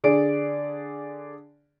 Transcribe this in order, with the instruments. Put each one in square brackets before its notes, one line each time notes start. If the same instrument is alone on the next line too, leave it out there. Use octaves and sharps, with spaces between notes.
[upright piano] D3 G#4 D5 D7